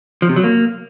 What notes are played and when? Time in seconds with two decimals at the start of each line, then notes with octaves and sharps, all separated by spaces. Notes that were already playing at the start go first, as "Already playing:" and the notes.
0.22 F3
0.29 C3
0.36 F#3
0.43 A#3